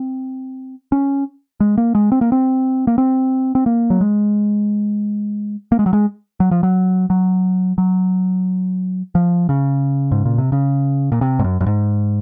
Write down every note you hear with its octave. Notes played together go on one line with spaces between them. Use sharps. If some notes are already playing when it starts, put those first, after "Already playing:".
Already playing: C4
C#4
G#3
A#3
G#3
C4
A#3
C4
A#3
C4
C4
A#3
F#3
G#3
A#3
G#3
F#3
G#3
F#3
F3
F#3
F#3
F#3
F3
C#3
G#2
A#2
C3
C#3
A#2
C3
G#2
F#2
F#2
G#2